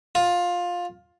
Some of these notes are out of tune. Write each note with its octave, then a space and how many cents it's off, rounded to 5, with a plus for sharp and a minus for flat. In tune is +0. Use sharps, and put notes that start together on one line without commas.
F4 +15